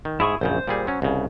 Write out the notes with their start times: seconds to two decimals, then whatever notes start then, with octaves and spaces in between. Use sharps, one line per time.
0.05 D#3
0.20 G#2 E4 G#4 C#6
0.41 A#1 F#2 C#3 C5
0.68 A#2 G3 G#4
0.87 F#3 C#4
1.02 C2 C#3